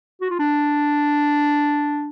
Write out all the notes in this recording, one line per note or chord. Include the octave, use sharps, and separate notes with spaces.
F#4
F4
D4